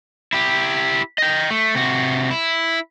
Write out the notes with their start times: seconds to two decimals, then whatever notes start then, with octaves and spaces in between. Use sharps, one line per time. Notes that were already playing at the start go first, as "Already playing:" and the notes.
0.33 E4 G4
1.18 D#5 G5
1.50 A3
1.75 C3 F#4
2.31 E4